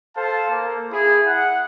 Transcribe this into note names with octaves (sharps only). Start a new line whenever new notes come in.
A4 C5 F5 A5
A#3
E4 G#4
F#5